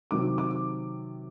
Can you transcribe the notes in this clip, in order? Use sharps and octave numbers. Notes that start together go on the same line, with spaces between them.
C3 D#3 F#3 D6
D6